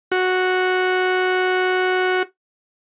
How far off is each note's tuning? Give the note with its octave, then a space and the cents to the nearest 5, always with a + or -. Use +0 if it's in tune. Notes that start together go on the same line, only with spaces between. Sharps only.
F#4 -5